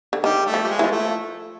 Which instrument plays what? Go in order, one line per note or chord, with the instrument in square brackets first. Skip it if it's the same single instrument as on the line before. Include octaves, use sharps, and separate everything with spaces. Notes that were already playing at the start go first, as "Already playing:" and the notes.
[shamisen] D3
[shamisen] D#3 [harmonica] G3
[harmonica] A3
[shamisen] F3
[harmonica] G3
G#3
[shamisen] E3
F3
[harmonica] A3